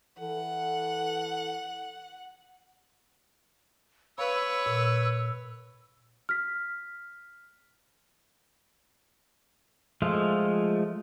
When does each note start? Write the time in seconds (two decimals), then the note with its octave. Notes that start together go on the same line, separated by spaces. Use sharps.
0.19 E3 A4 F#5
4.18 B4 C#5 F5 B5 E6
4.66 A#2
6.29 F6 B6
10.02 F3 G#3 A3 F4